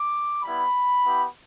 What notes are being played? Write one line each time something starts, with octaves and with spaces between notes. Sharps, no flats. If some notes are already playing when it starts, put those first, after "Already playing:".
Already playing: D6
G3 B3 E4 B5
B3 E4 G4